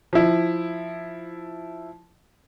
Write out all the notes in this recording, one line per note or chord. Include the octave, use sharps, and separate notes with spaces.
F3 E4